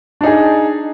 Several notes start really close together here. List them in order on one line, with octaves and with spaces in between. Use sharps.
D4 D#4 G#4